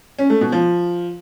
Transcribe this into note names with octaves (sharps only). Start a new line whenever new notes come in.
C#4
A3
B2
F3